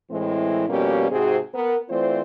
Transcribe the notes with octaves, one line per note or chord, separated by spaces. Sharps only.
A2 E3 G#3 C4 E4
F2 B2 G3 A#3 C#4 G4
G#2 C3 C4 F#4 G#4
B3 A#4
E3 A3 C4 F4 C5 D5